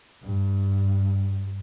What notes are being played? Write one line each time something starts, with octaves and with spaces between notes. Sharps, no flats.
G2